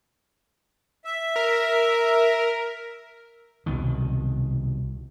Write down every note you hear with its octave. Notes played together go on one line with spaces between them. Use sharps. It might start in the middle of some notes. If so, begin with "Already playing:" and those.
E5
A#4
C2 B2 D#3